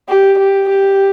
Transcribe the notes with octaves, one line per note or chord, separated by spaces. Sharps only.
G4
G4
G4